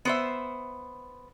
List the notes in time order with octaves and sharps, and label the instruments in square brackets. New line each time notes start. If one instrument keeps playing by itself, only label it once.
[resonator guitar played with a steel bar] B3 C5 E5